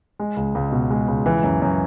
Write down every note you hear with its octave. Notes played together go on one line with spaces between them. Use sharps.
G#3
C#2
C#2
B2
G#3
C#2
E3
F#2
F#2